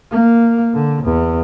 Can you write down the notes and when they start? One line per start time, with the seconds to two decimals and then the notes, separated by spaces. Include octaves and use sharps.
0.11 A#3
0.74 D3
1.04 E2